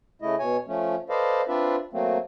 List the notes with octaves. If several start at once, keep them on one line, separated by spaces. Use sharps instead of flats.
C#3 A3 E4 D#5
B2 C#5 G#5
F3 A3 C#4
A4 B4 C5 D5 D#5 F5
C4 D4 F4 B4 D5 E5
F#3 A3 A#3 C4